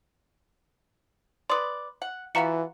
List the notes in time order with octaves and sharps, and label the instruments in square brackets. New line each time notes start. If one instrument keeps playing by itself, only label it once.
[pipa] B4 D5 [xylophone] C6 D#6
[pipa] F#5
[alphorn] E3 [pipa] B3 F4 F#4 [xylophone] F5 A#5 C#7